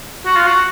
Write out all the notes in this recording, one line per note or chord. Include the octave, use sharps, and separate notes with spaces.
F#4
F4
F#4